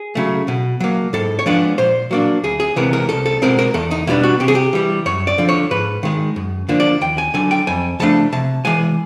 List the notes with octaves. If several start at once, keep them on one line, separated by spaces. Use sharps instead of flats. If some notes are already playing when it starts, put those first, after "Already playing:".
Already playing: G#4
C#3 F#3 A3
B2
F#3 A#3
G#2 A4
C#5
F3 G#3 B3 D4 D5
A#2 C5
F#3 A#3 D4
D2 G#4
G#4
C3 E3 G#3 B3 A#4
A#4
C2 A4
A4
B2 G#3 C4 A#4
A#4
E2 A4
D#4
B2 G3 B3 D4 E4
F#4
C3 G4
G#4
G4
E3 G3
F#2 C#5
D5
D3 F3
C#5
G#2 B4
D#3 G#3
F#2
D3 F3 A#3 D4
D5
D#2 G5
G#5
D3 F#3 G#5
G5
F2 G#5
C#3 F3 A3 D4 A5
C3 A5
E3 G#3 G#5